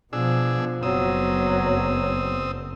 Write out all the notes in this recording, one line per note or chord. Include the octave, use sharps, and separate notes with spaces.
B2 F3 D4 G#4 E6
F#1 F#3 B3 C4 D#6 E6